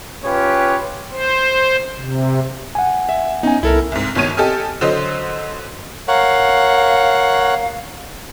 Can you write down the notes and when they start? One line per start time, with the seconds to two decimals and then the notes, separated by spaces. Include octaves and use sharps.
0.25 C#4 F4 G4 B4 C#5
1.11 C5
1.97 C3
2.75 F#5 G#5
3.09 E5
3.43 B3 C#4 D#4 G#5
3.63 C2 E4 A4 A#4
3.92 C2 G#2
4.15 G1 B2 D#3 C#5 D#7
4.37 G4 A4 D#5 G#5 F6
4.81 D3 F#3 C5 D#5
6.08 A#4 C#5 F5 F#5